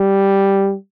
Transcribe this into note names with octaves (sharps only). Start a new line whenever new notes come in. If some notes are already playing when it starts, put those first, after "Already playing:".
Already playing: G3